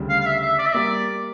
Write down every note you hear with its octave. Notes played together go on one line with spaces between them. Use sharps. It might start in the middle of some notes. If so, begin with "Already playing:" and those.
Already playing: D2 C#3 G3
F5
F5
E5
E5
D5
E5
G3 A#3 D5